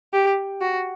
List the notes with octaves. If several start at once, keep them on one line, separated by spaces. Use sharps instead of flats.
G4
F#4